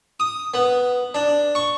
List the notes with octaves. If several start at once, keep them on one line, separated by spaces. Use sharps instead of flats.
D#6
B3
D4
C#6